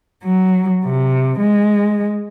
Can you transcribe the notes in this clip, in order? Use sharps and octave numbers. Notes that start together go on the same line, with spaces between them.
F#3
C3
G#3